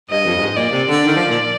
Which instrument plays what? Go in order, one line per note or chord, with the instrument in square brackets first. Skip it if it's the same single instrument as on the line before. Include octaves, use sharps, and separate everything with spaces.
[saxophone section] G2 [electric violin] D#5
[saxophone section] F2
G2
G#2
[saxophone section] A#2 [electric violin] D5
[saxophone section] C3
D3
D#3
F3
A#2